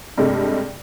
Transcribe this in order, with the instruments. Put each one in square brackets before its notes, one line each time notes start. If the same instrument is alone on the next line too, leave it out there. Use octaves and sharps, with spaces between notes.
[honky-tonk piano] G2 C3 G#3 A3